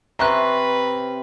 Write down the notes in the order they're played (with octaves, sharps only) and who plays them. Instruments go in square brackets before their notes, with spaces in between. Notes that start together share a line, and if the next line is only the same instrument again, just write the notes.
[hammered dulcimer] C3 [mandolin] C4 C#4 F#6 [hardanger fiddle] B4 [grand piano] A#5